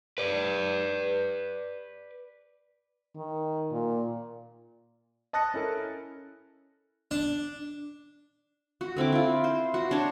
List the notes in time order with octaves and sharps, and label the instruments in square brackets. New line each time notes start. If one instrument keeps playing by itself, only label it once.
[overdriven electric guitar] B4 D5
[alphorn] D#3
A#2
[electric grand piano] D#5 A5 D#6 F#6 A#6 C#7
C#4 E4 A4 A#4
[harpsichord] D4
[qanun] F#4
D3 C4 E4 D6
E4 F4
C5
F#4
D4 C5 C#5